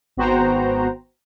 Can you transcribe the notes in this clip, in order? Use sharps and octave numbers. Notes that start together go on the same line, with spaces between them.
G#1 B3 F#4 C5 G5 A#5